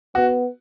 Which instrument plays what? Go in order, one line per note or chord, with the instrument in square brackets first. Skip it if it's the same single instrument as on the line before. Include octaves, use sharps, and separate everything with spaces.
[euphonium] B3 [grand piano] F#4